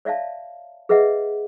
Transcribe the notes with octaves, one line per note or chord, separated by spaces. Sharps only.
C#5 D5 E5 F5 A5
G#4 B4 D#5 E5 F#5